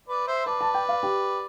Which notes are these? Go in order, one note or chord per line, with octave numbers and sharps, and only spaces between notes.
B4 D5
C5 E5
B4 D5 A5
A5
G5
F5
G4